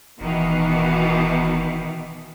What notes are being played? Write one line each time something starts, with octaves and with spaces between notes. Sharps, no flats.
F1 B2 D#3 E3